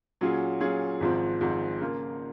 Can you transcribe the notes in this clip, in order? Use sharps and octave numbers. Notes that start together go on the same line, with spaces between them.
A#2 F#3 C#4 F4 G#4
A#2 F#3 C#4 F4 G#4
G#1 G#2 F3 C4
G#1 G#2 F3 C4
C#3 F3 A#3 F4